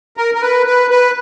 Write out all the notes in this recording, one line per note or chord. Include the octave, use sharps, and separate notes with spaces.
A#4
A#4
B4
B4
B4